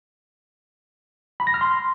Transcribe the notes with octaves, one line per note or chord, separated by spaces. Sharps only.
B5
A#6
F6
C6